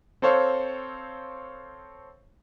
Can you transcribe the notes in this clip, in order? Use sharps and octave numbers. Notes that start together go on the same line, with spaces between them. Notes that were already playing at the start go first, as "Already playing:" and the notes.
C4 A4 C5 C#5 F5